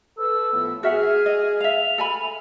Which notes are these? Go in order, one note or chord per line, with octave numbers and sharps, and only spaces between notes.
A4 B4 E6
A2 F3 B3
F#4 G#4 E5 F#5 F6
D#5
E5 F5 F7
A4 G#5 B5